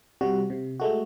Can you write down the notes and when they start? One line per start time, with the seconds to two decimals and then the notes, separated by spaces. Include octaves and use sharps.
0.21 C3 G3 F#4
0.50 C3
0.80 G#3 A3 F#4